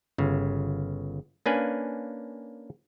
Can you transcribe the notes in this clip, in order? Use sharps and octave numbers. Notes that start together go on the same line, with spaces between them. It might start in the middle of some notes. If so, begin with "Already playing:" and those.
G1 C#3
A#3 C#4 D4 B4 F5 G#5